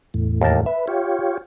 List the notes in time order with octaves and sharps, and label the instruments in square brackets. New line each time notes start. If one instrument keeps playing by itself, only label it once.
[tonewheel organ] E2 A2
[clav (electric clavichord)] D#2 A#4 A5
[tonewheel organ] B4 [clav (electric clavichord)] E5
[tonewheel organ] F4 G4 C#5